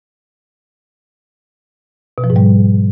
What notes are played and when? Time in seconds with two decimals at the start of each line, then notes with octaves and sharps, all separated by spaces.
2.18 B2
2.24 F3
2.30 G#2
2.36 G3